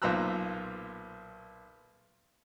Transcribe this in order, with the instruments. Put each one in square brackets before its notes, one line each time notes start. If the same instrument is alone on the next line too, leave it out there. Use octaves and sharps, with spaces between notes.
[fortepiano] B1 A#2 C5 A#5 E6 F#6